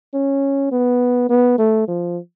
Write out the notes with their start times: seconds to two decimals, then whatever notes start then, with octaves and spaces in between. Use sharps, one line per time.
0.14 C#4
0.72 B3
1.29 B3
1.58 A3
1.88 F3